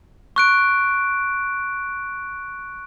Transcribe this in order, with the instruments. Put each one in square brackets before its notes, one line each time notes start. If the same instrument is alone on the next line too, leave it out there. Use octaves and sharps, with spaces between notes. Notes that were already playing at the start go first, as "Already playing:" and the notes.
[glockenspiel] C#6 F#6 D7